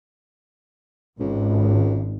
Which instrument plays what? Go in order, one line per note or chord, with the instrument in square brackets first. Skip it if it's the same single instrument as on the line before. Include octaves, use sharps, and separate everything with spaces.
[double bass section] G#1 [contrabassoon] C#2